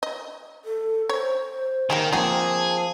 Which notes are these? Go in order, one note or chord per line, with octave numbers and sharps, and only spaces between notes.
D#5
A4
C5 C#5
D#3 A#3 G4 G#4
D#3 F3 A#3 C4 F#4 G#4 A5